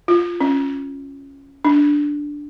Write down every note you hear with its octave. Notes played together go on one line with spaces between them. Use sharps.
F4
C#4
D4